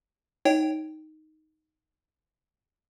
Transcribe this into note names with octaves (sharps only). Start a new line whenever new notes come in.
D#4 C#5 G5